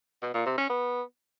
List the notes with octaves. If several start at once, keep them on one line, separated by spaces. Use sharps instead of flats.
B2
A#2
C3
C#4
B3